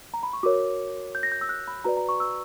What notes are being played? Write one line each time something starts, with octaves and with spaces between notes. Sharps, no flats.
A#5
B5
C#6
F#4 A#4 C#5 D6
G6
A#6
G6
E6
F#6
B5
F#4 B4 D5 A#5
A#5
C#6
E6